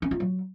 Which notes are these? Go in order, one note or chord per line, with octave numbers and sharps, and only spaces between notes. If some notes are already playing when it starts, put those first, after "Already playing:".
C#4
F4
F#3